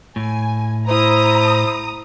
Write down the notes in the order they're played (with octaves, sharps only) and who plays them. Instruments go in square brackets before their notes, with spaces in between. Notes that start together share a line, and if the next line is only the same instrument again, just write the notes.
[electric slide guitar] A2 [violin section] G#5
[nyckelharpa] E4 [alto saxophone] C5 [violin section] A#5 D#6